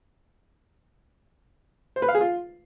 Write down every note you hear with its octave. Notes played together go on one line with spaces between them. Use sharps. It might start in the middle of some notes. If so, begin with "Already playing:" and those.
C5
B4
F5
G#4
F4